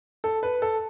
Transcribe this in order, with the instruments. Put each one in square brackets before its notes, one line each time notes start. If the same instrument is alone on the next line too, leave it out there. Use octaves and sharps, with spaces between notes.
[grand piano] A4
B4
A4